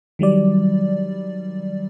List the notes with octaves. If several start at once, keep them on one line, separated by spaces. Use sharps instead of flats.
D#3 F#3 G3 D5